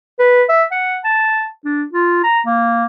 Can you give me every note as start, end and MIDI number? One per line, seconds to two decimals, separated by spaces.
0.19 0.43 71
0.49 0.63 76
0.72 0.99 78
1.04 1.47 81
1.65 1.83 62
1.93 2.22 65
2.24 2.40 82
2.46 2.85 58